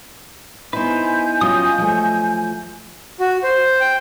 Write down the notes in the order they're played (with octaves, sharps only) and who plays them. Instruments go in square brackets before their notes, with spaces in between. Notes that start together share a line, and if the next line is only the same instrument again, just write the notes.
[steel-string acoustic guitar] B3 D#4 E4 [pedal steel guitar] B4 C5 [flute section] G#5 G6
[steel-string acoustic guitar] F#3 C#4 F4 [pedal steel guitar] D#5 G5 D#6
[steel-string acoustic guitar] F3 F#3 A3
[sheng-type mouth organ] F#4
C5
G5